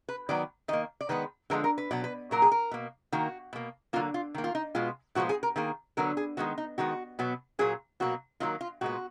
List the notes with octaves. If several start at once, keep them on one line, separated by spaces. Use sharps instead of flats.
B4
D#3 F#3 B3 D5
D#3 A#3 D#5
D5
D#3 G#3 B3 B4
D3 F3 G#3 B3 A#4
A#4
B4
B2 F#3 B3 D5
B4
A#2 F#3 A#3 A#4
G#4
A#4
B2 A#3
D#3 A#3 F#4
B2 A#3
D3 F#3 A#3 F4
F4
D#3 A#3
F4
D#4
B2 G#3 B3 F4
A#2 F3 G#3 B3 F#4
G#4
A#4
D#3 A#3 G#4
D3 F#3 B3 A#4
G#4
D#3 G#3 B3 F#4
D#4
D#3 G#3 B3 F#4
B2 F#3 B3
A#2 F#3 A#3 G#4
B2 F#3 A#3 F#4
D#3 F#3 A#3 F4
F4
A#2 G#3 B3 F#4